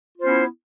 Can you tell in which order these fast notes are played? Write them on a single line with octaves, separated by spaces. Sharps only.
F4 C5 B3 C#4 E4